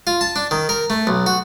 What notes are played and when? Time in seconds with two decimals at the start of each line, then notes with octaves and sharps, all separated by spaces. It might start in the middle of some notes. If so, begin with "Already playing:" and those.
0.07 F4
0.21 A5
0.36 D4
0.51 D#3
0.69 A#4
0.90 A3
1.07 B1
1.26 F#4